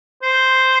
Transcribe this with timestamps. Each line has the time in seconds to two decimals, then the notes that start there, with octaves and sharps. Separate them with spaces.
0.22 C5